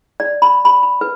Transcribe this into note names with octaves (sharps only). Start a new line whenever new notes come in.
D5
B5
B5
B5
B4